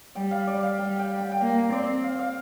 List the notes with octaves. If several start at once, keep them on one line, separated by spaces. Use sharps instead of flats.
G3 G5
F5
D5
F5
G3 G5
G5
G5
G5
A#3 F5
C4 D5
F5
F5